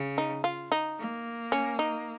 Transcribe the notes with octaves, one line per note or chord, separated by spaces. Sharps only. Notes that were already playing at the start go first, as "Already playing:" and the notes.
Already playing: C#3
D#4
F4
D#4
A#3
C#4
D#4